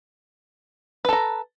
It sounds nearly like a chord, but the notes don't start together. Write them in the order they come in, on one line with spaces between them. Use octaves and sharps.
B4 A4 A#5